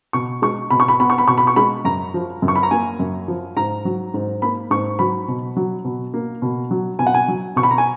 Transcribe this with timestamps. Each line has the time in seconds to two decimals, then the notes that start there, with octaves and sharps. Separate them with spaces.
0.13 B2 C#6
0.42 G#3 C#6
0.71 B2 B5
0.80 C#6
0.88 B5
1.00 B3 B5
1.10 C#6
1.18 B5
1.28 B2 C#6
1.38 B5
1.47 C#6
1.56 G#3 B5
1.85 F#2 A#5
2.14 F3
2.42 F#2
2.48 C#6
2.56 B5
2.63 A#5
2.71 A#3 G#5
3.00 F#2
3.28 F3
3.56 G#2 A#5
3.85 F#3
4.14 G#2
4.42 A#3 B5
4.71 G#2 C#6
4.99 F#3 B5
5.28 B2
5.56 F#3
5.85 B2
6.14 A#3
6.42 B2
6.71 F#3
6.99 B2 G#5
7.07 F#5
7.14 G#5
7.28 F#3
7.56 B2 C#6
7.63 B5
7.71 A#5
7.78 G#5